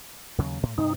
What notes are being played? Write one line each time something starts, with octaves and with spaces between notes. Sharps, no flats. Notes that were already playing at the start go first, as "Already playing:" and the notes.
D#2 C#3 F#3
A2
G2 C3 C4 D#4